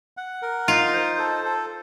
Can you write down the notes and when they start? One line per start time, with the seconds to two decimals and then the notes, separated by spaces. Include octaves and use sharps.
0.17 F#5
0.42 A#4
0.68 D#4 F4
0.93 C5
1.18 A4
1.45 A4